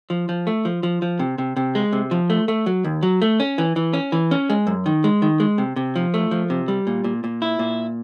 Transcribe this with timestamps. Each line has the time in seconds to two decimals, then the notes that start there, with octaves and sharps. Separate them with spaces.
0.10 F3
0.29 F3
0.47 A3
0.65 F3
0.83 F3
1.02 F3
1.19 C3
1.38 C3
1.56 C3
1.75 G#3
1.93 C3
2.11 F3
2.30 A3
2.48 A3
2.66 F#3
2.84 D#2
3.03 F#3
3.22 A3
3.40 C#4
3.58 E3
3.76 E3
3.94 C#4
4.12 E3
4.31 C#4
4.50 G#3
4.67 F#2
4.86 D#3
5.04 G#3
5.22 D#3
5.40 G#3
5.58 C3
5.76 C3
5.96 F3
6.14 A3
6.31 F3
6.50 C3
6.68 G3
6.87 A#2
7.04 A#2
7.24 A#2
7.42 E4
7.59 A#2